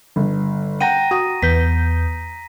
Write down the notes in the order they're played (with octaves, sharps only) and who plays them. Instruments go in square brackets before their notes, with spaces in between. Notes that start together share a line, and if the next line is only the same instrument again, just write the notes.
[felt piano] G1
[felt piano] F#5 G5 [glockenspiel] A#5 A#6 D#7
[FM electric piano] F#4 [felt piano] D#6
[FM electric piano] E2 B3 G6 [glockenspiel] B6